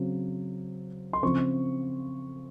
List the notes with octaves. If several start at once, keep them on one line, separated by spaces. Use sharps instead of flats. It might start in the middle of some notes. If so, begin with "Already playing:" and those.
Already playing: C#3 F#3 C4
C6
C#3 F3 C4 C#6